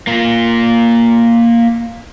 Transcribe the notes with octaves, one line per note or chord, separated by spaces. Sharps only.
A#3 F4